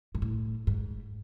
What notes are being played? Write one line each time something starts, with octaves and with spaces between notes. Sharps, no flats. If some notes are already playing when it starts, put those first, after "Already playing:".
G#2
A2
G#2